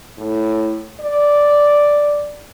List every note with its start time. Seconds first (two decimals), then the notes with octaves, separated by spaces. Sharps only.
0.18 A2
1.00 D5